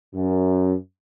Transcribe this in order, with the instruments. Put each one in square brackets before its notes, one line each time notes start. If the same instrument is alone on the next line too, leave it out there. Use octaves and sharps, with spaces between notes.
[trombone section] F#2